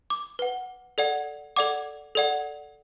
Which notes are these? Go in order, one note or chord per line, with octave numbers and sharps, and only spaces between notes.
D6
B4 F#5
A4 D5 F#5
A4 D5 F#5 D6
A4 D5 F#5